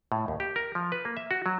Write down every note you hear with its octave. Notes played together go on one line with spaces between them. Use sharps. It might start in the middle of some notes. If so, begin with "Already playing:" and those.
A2
D#2
G4
A#4
F3
B4
A#3
E5
F#4
F#3